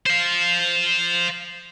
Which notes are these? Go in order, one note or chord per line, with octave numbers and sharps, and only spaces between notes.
C5 F5